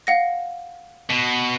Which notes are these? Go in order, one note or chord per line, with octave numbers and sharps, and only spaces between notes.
F5 F#5 A#6
B2